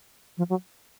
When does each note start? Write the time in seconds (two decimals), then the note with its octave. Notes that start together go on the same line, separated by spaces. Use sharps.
0.38 F3
0.50 F#3